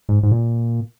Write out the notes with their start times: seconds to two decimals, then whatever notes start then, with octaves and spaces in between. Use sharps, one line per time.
0.09 G#2
0.23 G#2
0.32 A#2